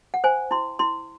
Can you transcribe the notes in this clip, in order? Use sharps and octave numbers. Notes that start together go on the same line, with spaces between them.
F#5
C5 G#5
E4 C6
E4 C6